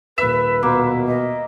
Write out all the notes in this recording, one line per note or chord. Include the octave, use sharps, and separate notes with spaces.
D#1 B4 E5 E7
B2 A#3
D#5